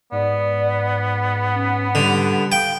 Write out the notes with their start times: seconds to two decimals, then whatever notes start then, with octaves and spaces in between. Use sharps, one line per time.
0.12 G#2 B3 D5
1.55 C#4
1.95 D3 G3
2.52 F5 G5